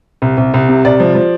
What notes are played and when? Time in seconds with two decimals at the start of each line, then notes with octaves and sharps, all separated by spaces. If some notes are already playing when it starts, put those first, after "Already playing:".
0.22 C2
0.37 C2
0.54 C2
0.69 C3
0.85 C2 D5
1.00 F3
1.15 F3